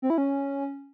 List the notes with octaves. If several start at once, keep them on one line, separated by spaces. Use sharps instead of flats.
C4
E4
C#4